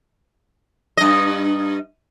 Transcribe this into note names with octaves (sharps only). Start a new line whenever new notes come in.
G2 D#5